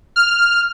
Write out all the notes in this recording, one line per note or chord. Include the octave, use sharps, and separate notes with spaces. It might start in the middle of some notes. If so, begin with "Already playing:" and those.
F6